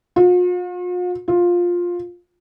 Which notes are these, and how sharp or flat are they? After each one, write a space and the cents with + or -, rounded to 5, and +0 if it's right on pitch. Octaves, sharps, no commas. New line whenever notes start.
F4 +45
F4 +10